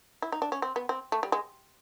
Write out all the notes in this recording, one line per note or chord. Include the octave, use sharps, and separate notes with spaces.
E4
D#4
D4
C#4
C4
B3
C4
A3
G3
G#3